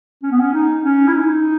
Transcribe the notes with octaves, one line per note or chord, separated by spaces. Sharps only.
C#4
B3
C#4
D#4
C#4
E4
D#4